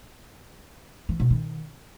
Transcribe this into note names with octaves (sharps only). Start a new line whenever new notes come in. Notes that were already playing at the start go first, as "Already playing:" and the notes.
E3
B2
D#3